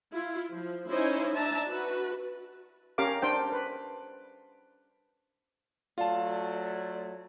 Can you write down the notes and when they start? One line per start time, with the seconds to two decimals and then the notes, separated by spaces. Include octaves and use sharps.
0.12 E4 F4
0.52 F3
0.91 C#4 D#4 E4 C5 C#5 D#5
1.34 D4 E5 A5 A#5
1.68 F#4 B4
2.98 C#4 G4 A#4 F5 D6
3.22 D4 C5 G5
3.52 B4
5.98 F#3 A3 F4 D5 F5 F#5 A5